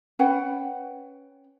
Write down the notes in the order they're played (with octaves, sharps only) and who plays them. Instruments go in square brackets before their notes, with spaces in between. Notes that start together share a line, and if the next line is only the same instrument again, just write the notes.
[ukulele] C#4 B4 F#5 G5